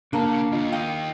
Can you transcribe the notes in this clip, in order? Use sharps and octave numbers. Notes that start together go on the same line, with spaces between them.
C#3 A#3 D4 A#4 A5 A#5
D#2 F4 D#5
D#5 F5 G5